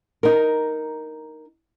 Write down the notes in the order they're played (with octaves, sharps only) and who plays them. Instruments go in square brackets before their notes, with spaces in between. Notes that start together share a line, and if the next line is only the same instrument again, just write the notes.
[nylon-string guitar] D#4 A#4